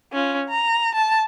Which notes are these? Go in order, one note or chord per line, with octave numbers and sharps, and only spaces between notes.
C#4 F4
A#5
A5